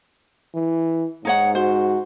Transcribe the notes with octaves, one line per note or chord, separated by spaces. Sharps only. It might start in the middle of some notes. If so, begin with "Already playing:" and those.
E3
G#2 D#4 C#5 F#5
F#4 C5